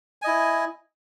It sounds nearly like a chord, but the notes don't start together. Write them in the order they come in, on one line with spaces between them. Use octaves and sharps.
G#5 D#5 E4